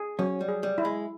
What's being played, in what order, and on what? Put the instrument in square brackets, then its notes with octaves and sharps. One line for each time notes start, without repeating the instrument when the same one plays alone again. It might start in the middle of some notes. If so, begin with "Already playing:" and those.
Already playing: [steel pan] G#4
[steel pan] F#3 [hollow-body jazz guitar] C#4
[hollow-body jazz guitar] G3
[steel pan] G#4
[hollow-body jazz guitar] G3
[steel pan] E4
[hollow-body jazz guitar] G#3